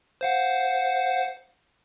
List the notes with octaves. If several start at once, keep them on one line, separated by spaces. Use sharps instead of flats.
C5 F5 F#5